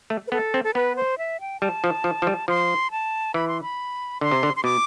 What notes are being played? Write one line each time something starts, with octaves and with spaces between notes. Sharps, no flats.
A3
B4
B3 A4
C4
A4
B3 B4
C5
E5
G5
G3 A5
F3
F3
F3
G3
F3 C6
A5
E3 B5
C6
B5
D3 C6
C3
D3
C6
B2 D6